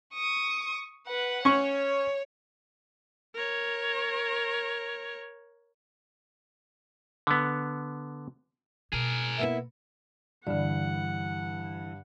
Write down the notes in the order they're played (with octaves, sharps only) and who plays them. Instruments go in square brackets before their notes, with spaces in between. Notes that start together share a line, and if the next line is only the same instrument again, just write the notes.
[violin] C#6 D#6
B4 F#5
[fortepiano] C#4 C#6 [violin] C#5
[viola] A#4 C#5
[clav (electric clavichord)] D3 B3
[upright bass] B2 [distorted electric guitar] G#4 A#4
[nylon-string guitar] A#3 B3 E4 [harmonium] E5
[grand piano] G2 [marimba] D3 D5 [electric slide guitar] E3 [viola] F#5